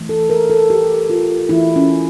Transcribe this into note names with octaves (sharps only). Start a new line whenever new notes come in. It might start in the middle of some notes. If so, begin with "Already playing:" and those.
Already playing: E3 A3
A4
A#4
A4
G4
F4
E3 A3 E4
C#4